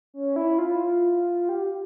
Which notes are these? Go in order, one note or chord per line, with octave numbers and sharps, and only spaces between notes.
C#4
E4
F4
G4